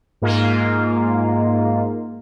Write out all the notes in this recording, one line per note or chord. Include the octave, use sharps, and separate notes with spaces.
G#2 A#3 F4